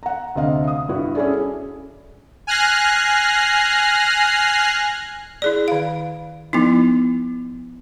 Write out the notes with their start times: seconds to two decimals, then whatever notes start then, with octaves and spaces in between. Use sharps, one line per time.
0.03 F#5 A#5
0.35 D2 C3 D#5 F5
0.68 D#6
0.89 G2 E4 F#4
1.15 C#4 E4 G#4 A4 D5
2.47 G#5 F6 F#6 A#6 C7
5.42 E4 G#4 D5
5.68 D#3 F5
6.53 F3 B3 D#4 E4